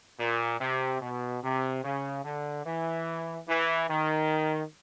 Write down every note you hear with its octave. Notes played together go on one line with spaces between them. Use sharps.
A#2
C3
B2
C3
C#3
D3
E3
E3
D#3